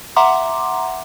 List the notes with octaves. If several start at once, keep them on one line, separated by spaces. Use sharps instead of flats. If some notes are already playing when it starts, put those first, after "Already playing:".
E5 F#5 A#5 C6 D6